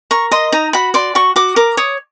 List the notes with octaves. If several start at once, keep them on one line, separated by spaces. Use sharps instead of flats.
A#4 C#6
D#5 C6
D#4 A#5
F#4 B5
D5 C6
F#4 C#6
F#4 D6
A#4 D6
C#5 D#6